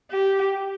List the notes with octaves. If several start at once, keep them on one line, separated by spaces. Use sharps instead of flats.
G4